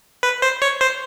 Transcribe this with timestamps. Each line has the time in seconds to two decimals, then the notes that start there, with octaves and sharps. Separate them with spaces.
0.23 B4
0.42 C5
0.62 C#5
0.81 C5